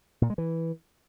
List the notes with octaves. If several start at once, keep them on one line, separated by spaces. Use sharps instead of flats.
A#2
G#3
E3